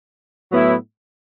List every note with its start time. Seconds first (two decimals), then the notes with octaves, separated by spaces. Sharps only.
0.51 A2 F#3 B3 E4